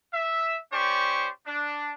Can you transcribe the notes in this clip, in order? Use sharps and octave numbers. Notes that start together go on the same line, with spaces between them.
E5
C#4 G4 C5 D5 C#6
D4